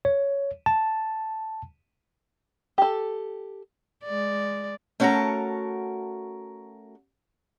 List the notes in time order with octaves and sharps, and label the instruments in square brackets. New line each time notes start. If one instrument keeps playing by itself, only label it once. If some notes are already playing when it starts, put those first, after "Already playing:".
[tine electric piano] C#5
A5
[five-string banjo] G4 A4
[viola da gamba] G#3 D5
[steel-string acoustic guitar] A3 C#4 F#4 A#4 A5 A#5